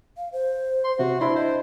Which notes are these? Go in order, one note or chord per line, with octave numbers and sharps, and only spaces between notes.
F5
C5
C6
C3 F#4
D4 E4 C5 C6
C5 D#5